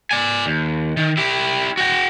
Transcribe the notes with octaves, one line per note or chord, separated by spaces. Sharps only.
D5 G#5
D#2
D#3
E4 G4
F#4 G5